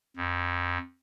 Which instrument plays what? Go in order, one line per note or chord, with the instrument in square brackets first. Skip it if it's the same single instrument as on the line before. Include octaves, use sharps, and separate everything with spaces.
[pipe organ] F2